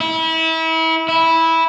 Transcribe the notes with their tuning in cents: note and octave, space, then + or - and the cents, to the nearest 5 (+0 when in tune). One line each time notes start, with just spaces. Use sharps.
E4 -30
E4 -10